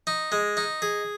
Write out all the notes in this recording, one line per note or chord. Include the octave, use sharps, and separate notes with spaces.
D#4
G#3
D#4
G#4